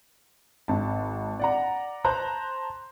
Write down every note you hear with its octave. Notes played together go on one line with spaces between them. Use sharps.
G#1 A5
D5 F#5 A#5
C5 A5 A#5 F#6